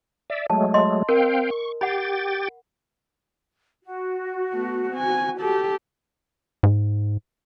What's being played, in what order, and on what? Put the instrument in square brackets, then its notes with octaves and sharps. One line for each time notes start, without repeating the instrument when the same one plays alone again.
[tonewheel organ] D5 E5
[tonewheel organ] F#3 G#3 A3 [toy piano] A5
[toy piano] D#5 C6
[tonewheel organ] C4 F5 G5 [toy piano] A#4
[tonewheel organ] C#6
[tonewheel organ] G4 G5 A6 [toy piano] F#5 B5
[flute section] F#4
[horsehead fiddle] A3 B3
C4 G#5
G4 A4
[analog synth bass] G#2